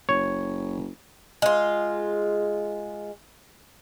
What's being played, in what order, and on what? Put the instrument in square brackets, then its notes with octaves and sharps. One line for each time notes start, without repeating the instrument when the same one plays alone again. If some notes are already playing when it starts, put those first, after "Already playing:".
[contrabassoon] F#1 [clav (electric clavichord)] C#5
[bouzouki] G#3 F4